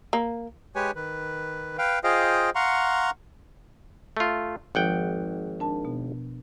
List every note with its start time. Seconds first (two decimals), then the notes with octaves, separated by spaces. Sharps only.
0.13 A#3
0.76 G#3 G4 B4 C#5 G#5
0.96 D#3 B4
1.78 B4 F5 G5
2.04 F4 G#4 C5 D#5 F5 G5
2.55 F5 F#5 A#5 C6 C#6
4.17 A3 F4
4.75 G#1 F3 F#5 G5
5.60 D4 A#4 A5
5.85 B2 B3